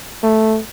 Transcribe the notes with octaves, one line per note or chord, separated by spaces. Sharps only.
A3